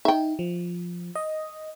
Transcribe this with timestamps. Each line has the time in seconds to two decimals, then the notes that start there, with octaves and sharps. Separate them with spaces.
0.05 D#4 E5 G5
0.39 F3
1.15 D#5